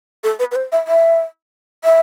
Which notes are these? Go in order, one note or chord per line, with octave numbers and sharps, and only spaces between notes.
A4
B4
B4
C5
E5
E5
E5